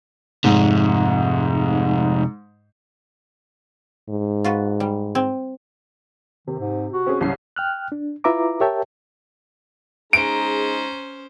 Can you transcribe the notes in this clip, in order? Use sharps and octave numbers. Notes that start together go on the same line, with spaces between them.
F2 G#2 C3
G#2
F4 F#4 B4
G3
C4
C3 D#3
G#2
F#4
C4 C#4 G#4
C2 C#3 F#3 C7
G5 F6 F#6
D4
E4 F4 B4 E5 A#5 D6
G4 A#4 C#5 E5 G5 A5
G#3 C#4 D#4 G#4 C5 A#5 D7